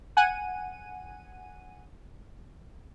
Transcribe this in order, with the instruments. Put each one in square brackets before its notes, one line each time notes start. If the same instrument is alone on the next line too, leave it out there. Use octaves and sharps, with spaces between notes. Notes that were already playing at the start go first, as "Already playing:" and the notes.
[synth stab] F#5 G#5 D#7